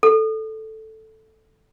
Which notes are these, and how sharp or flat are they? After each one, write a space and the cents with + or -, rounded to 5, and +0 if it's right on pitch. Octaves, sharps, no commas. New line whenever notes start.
A4 +0